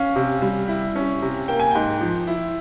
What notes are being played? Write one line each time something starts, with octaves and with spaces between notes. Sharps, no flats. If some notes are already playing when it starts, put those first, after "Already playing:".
Already playing: C#4 F5
C3
G3
E4
C#4
C3
A#3 G5
G#5
G#2 G5
F3
E4